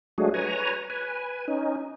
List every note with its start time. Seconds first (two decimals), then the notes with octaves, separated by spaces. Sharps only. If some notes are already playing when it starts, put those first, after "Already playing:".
0.18 F#3 G#3 A3 D4 F#4 G#4
0.34 B4 C#5 G#5 A#5
0.90 B4 G#5
1.48 C#4 D#4